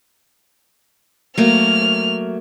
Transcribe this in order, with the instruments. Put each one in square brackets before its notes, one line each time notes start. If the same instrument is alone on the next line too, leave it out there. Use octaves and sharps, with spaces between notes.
[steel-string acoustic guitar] F#3 A3 A#3 [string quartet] F6